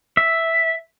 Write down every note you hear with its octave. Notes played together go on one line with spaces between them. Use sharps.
E5